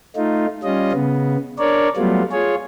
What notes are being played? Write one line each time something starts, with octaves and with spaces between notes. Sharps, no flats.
A3 D#4 F4
G3 C#4 F4 D#5
C#3 B3
D4 A#4 C#5 D5
F#3 G3 A3 B3 F4
F4 G#4 C#5